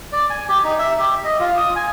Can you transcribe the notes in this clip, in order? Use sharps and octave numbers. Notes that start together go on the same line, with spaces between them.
D5
G#5
G4
D#4
E5
G4
D#5
F4
D#6
G#5